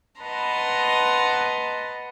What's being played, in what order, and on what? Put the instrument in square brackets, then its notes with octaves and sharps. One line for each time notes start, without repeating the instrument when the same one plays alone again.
[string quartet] B4 D#5 F#5 A5 A#5 C6